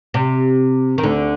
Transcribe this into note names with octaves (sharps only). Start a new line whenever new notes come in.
C3
D#3
D2 D3